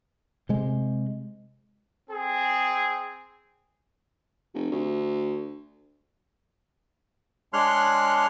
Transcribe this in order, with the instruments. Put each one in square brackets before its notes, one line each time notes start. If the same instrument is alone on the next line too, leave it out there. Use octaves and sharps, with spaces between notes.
[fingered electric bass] C3 G#3
[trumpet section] C4 G#4
[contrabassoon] F1
D2
[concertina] G#3 D4 C#5 C6 F6 F#6